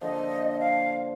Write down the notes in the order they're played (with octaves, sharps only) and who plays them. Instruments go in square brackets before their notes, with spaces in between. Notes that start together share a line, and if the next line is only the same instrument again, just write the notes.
[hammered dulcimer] A#2 D3 F3 [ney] D#5
[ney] F5